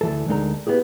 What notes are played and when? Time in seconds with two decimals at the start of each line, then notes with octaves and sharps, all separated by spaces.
0.01 D2 E3 A4
0.28 D2 D3 G#3 D#4 A#4 A#5
0.67 B3 E4 G4 G#4